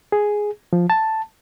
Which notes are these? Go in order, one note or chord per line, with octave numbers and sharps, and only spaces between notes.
G#4
F3
A5